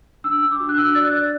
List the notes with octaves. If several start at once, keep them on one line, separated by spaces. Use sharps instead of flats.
D4 E6
D4
D6
F#4
F#6
D4 E6
D5 A6
F#6
D5